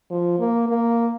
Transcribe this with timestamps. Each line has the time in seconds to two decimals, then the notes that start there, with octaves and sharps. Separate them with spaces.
0.11 F3
0.39 A#3
0.69 A#3